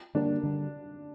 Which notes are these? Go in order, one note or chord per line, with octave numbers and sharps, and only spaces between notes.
D3 G3 A#3 D4
D3 G3